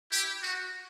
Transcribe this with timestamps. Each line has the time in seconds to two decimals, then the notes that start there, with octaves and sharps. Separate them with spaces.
0.12 E4 G4
0.42 F#4